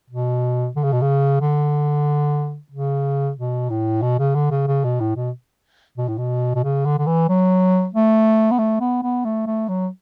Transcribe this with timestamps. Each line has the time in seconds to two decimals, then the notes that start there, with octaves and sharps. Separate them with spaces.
0.10 B2
0.76 D3
0.84 C#3
0.93 B2
1.02 C#3
1.41 D3
2.72 C#3
3.37 B2
3.70 A2
4.02 B2
4.19 C#3
4.35 D3
4.51 C#3
4.67 C#3
4.84 B2
5.00 A2
5.16 B2
5.97 B2
6.08 A2
6.18 B2
6.55 B2
6.64 C#3
6.85 D3
6.99 D3
7.06 E3
7.29 F#3
7.95 A3
8.51 B3
8.59 A3
8.80 B3
9.03 B3
9.25 A3
9.47 A3
9.68 F#3